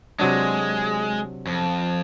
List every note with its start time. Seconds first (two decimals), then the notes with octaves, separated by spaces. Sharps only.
0.20 C3 F#3 G#3 D4
1.47 F2